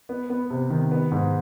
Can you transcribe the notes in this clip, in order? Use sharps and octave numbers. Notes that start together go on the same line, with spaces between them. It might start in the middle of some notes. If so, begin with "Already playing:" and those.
B3
B3
C3
D#3
B3
G#2